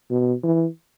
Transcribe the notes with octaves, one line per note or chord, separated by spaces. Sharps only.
B2
E3